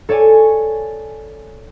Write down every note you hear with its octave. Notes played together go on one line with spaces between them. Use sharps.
A4 C#5 D5 G#5